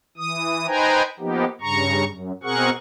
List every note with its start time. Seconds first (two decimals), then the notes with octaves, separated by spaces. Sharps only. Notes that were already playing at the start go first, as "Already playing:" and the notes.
0.17 E3 D#6
0.67 D#4 B4 C5 G5 G#5 A#5
1.20 F3 A#3 B3 D#4 G4
1.61 G2 C#3 A#5 C#6
2.07 F#2
2.43 B2 C4 G#4 A#4 F#5 C#6